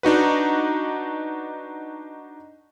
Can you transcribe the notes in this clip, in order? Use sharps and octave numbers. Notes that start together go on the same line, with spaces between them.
D4 D#4 F#4 B4